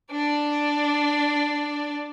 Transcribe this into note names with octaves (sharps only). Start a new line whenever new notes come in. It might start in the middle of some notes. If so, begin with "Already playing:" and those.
D4 D5